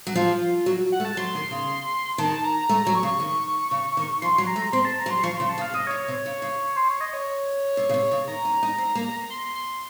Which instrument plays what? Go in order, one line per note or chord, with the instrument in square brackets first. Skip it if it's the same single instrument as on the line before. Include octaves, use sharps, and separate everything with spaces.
[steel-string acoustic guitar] F#3
[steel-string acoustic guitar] F3 [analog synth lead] F4
[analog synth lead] F4
[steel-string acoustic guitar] F#3 [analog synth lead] F#4
[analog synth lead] F#5
[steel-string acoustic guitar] A3
[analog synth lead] A5
[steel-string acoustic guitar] F#3 [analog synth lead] C6
[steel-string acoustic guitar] D#3
C#3
[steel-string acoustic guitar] D#3 [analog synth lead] A5
[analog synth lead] A#5
[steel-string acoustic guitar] A3 [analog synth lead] A#5
[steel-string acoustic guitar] F#3
[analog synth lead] C#6
[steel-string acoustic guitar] C#3
D#3
C#3
D#3
[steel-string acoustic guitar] F3 [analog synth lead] C6
[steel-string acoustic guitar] F#3
[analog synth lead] A#5
[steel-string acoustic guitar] A3
[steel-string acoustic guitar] C4 [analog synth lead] C6
[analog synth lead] A5
A#5
[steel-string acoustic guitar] F#3
[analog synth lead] C6
[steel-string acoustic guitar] F3 [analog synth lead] C#6
[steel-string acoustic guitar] C#3 [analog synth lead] C6
[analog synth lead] A5
[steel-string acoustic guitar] C#3
[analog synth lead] F5
[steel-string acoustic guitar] C3 [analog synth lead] D#5
[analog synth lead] C#5
[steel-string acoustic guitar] C3
[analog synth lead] C#5
[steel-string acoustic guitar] C3
[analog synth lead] C#5
[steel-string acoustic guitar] C#3
C#3
[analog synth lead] C5
C#5
D#5
C#5
[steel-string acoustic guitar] C3
C#3
C3
C#3
[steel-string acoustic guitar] D#3 [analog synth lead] A#5
[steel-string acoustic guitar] C#4
D#4
C4
A#3
[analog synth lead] C6
C6